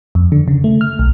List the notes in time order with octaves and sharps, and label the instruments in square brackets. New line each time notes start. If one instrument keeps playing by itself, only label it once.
[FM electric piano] F2
D3
C#3
A3
F6
B1